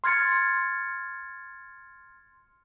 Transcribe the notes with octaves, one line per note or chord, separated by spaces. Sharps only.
C6 F6 G#6 A6 C#7